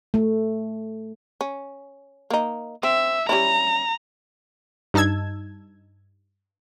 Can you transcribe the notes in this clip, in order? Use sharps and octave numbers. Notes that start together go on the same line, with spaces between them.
A3
C#4
A#3 D#4
C4 E5
G3 C#4 E4 A#5
G2 D#4 A5 E6 G#6